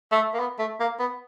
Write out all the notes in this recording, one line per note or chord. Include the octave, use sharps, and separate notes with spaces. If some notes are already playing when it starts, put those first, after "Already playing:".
A3
A#3
B3
A3
A#3
B3